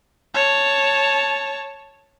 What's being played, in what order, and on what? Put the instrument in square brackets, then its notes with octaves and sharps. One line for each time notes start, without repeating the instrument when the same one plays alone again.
[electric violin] C#5 A5